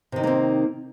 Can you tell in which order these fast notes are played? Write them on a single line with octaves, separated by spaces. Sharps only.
C3 D#3 D#4 A#3 C4